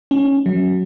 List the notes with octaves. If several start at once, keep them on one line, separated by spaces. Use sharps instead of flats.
C#4
F#3